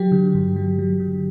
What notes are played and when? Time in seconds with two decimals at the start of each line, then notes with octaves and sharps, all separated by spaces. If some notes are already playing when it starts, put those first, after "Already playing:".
Already playing: F#3 G4
0.12 D3
0.35 G2
0.56 F#3
0.79 F#3
1.00 D3